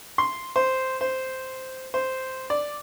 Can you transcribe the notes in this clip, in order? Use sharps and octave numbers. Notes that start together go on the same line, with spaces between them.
C6
C5
C5
C5
D5